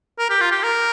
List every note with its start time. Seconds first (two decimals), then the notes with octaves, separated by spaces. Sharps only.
0.18 A#4
0.30 G4
0.41 F4
0.51 G4
0.63 A#4